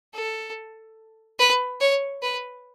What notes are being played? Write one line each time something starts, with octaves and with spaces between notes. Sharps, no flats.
A4
B4
C#5
B4